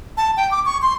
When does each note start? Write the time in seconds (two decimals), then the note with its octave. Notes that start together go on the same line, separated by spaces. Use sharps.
0.17 A5
0.37 G5
0.51 D6
0.66 C#6
0.82 C6